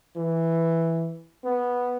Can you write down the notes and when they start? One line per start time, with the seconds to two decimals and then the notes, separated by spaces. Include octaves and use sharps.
0.16 E3
1.45 B3